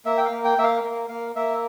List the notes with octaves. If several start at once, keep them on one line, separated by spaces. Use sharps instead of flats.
A#3 E5
G5
F5
A#3
G5
A#3 E5
F5
A#3
A#3 F5
A#3 E5